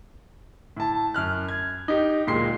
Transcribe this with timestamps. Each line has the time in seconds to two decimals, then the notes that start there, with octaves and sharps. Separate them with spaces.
0.77 A2 A5
1.14 F#2 F6 F#6
1.49 G#6
1.88 D#4 G4
2.27 D1 A#2 G#3 C6 C7